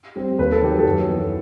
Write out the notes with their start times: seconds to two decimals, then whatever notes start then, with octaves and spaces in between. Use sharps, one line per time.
0.16 G3 C4
0.38 D#2 B4
0.52 A4
0.62 D#3 F#3 G4
0.79 A4
0.86 F#2
1.08 E3 B3